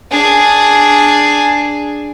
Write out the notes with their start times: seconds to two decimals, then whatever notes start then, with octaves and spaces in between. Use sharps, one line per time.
0.11 D4 G#4